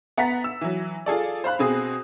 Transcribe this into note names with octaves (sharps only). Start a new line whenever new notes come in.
B3 F#5 A#5 A6 B6
E6
E3 F#3
F4 G#4 A4 D5
C5 F5 B5 F#6
B2 C4 G#4 D#6